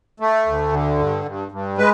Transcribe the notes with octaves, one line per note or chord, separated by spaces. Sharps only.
A3
D2
D3
G2
G2
G2
G#3 B4